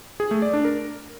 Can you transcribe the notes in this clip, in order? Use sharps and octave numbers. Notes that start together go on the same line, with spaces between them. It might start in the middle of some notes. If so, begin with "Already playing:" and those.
G#4
A3
D5
D4
A#4